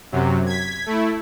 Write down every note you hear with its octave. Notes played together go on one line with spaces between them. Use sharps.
F#2 C3 F#3
G#6 B6
A3 E4